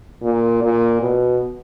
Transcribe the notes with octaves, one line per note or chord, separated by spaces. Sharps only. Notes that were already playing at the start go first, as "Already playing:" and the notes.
A#2
A#2
B2